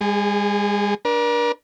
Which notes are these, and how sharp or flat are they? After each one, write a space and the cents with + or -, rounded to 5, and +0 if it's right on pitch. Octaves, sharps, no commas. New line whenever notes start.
G#3 -45 G#4 +0
D4 +0 A#4 +40